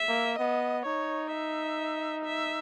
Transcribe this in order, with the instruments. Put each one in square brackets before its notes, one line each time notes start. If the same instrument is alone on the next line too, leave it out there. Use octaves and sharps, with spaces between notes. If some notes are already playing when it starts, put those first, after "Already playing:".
Already playing: [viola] E5
[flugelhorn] A#3
[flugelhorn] B3 [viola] D#5
[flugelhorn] D#4 [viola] C#5
[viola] E5
E5